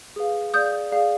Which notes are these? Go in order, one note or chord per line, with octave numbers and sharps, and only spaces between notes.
G#4 B4 F5
G#4 D5 F5 D#6 G6
G#4 D5 F5